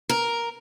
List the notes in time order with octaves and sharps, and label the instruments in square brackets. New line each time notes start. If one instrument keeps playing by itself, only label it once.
[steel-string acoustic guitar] A#4